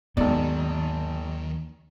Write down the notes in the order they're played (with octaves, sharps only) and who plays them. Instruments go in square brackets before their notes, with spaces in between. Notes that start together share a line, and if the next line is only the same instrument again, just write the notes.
[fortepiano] G#1 D5 [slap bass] D#2 F#3 [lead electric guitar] D#3 [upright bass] B3